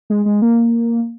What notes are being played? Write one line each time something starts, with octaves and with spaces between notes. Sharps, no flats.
G#3
G#3
A#3